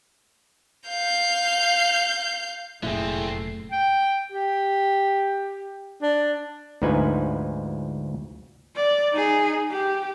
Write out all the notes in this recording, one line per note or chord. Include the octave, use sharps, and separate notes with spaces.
F5 G6
F1 F#2 A#2 D3 A3 C4 E4 G#4
G5
G4
D4
D2 G#2 F3 D#4 B4 G#5
D5
D#4 G#4
G4